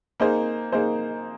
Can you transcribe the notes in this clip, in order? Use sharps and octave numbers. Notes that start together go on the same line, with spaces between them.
A#3 D#4 G#4 C5
A#3 D#4 G#4 C5